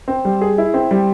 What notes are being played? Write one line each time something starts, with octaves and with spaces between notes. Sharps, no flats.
C4
G3
G#4
E4
C4
G3